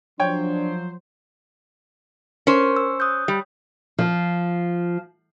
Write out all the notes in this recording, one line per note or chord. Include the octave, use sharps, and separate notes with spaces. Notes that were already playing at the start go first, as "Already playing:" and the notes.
F3 F#3 D4 C5 C#5 G5
C#4 A#4 C5
E6
D#6 F#6 G6
G3
F3